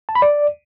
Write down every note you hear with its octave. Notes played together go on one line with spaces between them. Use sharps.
A5
B5
D5